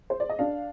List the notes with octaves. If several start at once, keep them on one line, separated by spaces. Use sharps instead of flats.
C5
D5
D#5
D4 F5